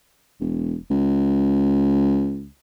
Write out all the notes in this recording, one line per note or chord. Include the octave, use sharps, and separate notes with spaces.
E1
C#2